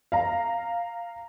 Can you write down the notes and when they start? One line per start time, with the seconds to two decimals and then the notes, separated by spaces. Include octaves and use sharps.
0.12 F5 A#5